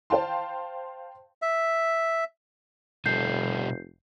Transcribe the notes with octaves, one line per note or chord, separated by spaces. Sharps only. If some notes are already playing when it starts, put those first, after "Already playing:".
C5 F5 G5 A5 C6
E5
F1 B2 G3 A4 G6 C7